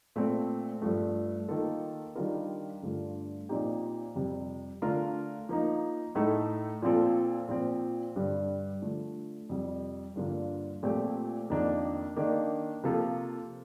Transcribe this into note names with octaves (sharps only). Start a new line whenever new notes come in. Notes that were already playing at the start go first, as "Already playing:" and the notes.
A#2 A3 C4
G2 F3 A3
D#3 A#3 F4 A4
D#3 G3 D4 F4 A#4
G2 D3 A3 D4 F4
A#2 F3 C4 D#4 G4
F2 C3 G3
D3 A3 D4 F4 A#4
F3 A#3 D#4
A2 A3 D#4 A4
A#2 F3 C4 F4 A4
A#2 F3 C4
G2 D3 G3
D3 F3 A3
F2 C3 G3
G2 D3 F3 A#3 F4
A#2 F3 A3 C4 G4
F2 D#3 A#3 D4
D#3 A#3 D4
C3 F3 A#3 F4 A4